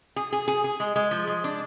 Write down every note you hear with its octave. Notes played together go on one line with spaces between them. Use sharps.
G#4
G#4
G#4
G#4
G#3
G#3
F3
G#3
D4